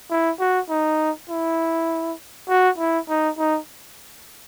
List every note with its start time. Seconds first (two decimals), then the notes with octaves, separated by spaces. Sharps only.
0.10 E4
0.39 F#4
0.69 D#4
1.29 E4
2.49 F#4
2.78 E4
3.09 D#4
3.38 D#4